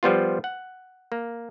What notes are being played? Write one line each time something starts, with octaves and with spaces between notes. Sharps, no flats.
F3 G3 B3 F4
F#5
A#3